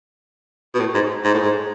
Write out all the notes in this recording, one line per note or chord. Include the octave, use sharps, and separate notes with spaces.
B2
A2
G#2
G#2
A2
G#2